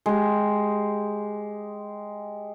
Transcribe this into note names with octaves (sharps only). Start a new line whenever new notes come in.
G#3 G4